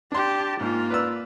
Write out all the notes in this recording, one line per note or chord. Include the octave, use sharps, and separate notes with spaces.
D4 G4 A5 C6
G#2 A#3 F4
B4 D5 E6